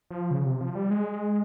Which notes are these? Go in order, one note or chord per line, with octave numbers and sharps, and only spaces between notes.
F3
C#3
C3
F3
G3
G#3